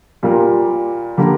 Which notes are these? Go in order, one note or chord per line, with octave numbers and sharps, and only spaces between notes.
A#2 G3 A#3 F4 A#4
D3 G3 A#3